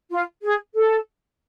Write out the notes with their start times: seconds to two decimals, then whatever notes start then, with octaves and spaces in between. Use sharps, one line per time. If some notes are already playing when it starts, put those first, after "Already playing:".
0.10 F4
0.43 G#4
0.75 A4